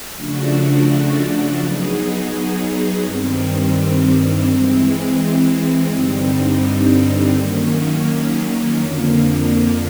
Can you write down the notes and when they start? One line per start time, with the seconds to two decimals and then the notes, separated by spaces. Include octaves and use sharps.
0.15 C#3 F3 A3 D4 F#4
1.58 F#3 B3 D#4 G#4
3.02 G2 D#3 G3 C4
4.47 E3 G#3 C4
5.90 G2 D3 G3 C4 D#4
7.34 D#3 F#3 A#3 C#4
8.77 F2 D3 F3 A#3